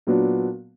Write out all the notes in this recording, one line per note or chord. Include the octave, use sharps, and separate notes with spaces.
A#2 F#3 B3 D4 F#4